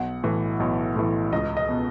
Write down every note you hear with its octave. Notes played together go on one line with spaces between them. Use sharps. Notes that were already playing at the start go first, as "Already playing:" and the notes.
Already playing: B1 F#5
A2 E3
B1
A2 E3
C#2 D#5
D#5
B2